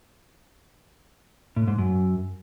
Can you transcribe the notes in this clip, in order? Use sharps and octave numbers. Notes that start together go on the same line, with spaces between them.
A2
G#2
F#2